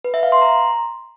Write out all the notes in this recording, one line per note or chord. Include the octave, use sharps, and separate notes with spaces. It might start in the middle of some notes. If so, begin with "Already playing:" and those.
B4
E5
F5
C6
A#5